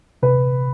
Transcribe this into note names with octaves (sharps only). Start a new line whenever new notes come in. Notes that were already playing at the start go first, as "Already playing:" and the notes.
C3 B4